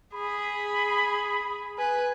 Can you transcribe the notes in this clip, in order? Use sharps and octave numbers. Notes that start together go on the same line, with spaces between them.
G#4 B5
B4 G#5